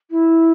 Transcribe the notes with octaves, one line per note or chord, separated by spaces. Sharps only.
E4